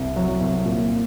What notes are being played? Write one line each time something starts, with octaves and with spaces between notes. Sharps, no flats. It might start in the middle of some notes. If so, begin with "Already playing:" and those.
Already playing: C2
F#3
C2
A#2